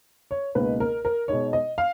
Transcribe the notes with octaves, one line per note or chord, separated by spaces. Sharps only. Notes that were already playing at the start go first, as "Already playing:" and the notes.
C#5
C#2 B2 A#3 D#4 B4
A#4
A#4
B2 G#3 D#4 C#5
D#5
F5